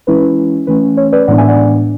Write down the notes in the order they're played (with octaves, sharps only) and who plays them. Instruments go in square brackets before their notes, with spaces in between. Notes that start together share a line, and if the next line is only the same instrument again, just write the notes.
[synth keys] E3 G#3 C#4 E4 B4
E3 A3 C#4 B4
C#5
B4 D5
A2 E3 G#3 B3 D4 D5 F#5
E5 G#5
D5 F#5